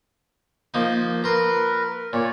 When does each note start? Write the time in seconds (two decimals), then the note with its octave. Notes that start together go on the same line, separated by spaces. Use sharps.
0.74 F3 A#3 D#4
1.24 A#4 B4 A#5 C6
2.13 A#2 C#5 D5